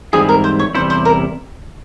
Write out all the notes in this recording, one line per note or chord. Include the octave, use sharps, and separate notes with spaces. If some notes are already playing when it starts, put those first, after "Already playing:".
G#2 E3 G3 C4 E4 G#4
A#4
C5
C#5
E2 C3 G3 C#4 E4 C5
C5
A#4